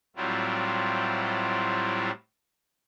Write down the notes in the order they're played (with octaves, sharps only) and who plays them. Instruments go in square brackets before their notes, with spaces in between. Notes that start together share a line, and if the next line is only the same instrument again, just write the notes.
[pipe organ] A2 F#3 G3 C4 E4 F4